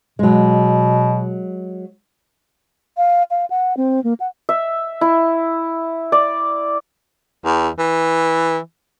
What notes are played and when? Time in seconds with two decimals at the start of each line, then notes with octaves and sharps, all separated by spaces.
0.19 B2 F#3 G#3
2.97 F5
3.31 F5
3.50 F#5
3.77 C4
4.04 A#3
4.20 F#5
4.49 E5
5.01 E4
6.12 D5
7.45 E2
7.79 E3